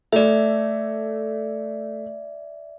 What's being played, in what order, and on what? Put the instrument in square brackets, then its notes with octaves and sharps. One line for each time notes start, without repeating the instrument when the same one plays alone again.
[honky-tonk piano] A3 [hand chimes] D5 E5